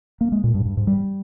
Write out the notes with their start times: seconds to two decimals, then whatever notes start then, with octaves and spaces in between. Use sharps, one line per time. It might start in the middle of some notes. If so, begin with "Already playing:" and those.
0.21 A#3
0.32 G#3
0.44 A#2
0.54 G2
0.65 G2
0.77 G#2
0.87 G3